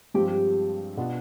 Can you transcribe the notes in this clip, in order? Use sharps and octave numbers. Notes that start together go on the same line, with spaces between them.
G2 F3 G#3 C4 G4
B2 B3 D4 F4